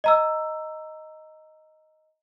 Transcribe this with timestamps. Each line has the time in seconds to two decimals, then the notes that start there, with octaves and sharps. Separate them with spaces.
0.04 D#5 A#5 E6